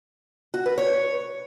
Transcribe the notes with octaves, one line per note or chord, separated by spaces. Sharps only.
F#4
B4
C#5